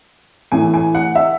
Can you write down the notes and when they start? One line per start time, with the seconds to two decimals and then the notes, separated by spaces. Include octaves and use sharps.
0.52 A2 E3 G#5
0.74 G#5
0.95 F#5
1.15 E5